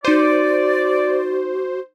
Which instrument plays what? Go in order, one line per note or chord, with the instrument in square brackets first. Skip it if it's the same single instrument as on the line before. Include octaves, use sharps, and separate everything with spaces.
[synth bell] D#4 G6 D#7 [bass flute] F#4 [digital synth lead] C5 [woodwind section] D5